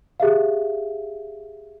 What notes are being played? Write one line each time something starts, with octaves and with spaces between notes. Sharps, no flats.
G4 G#4 E5 F5